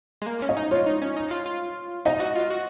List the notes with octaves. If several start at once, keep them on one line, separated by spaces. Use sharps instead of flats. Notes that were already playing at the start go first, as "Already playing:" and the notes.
G#3
A#3
C#4
D#5
D#4
F4 C#5
D#4
C#4
D#4
F4
F4
D#4 D#5
F#4
F4
F#4